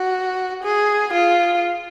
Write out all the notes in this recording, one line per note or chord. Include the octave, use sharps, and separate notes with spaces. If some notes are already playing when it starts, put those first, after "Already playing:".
Already playing: F#4
G#4
F4